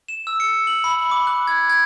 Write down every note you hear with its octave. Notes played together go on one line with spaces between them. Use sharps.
E7
E6
C#7
F#7
B5
D6
F#6
G#6
G#6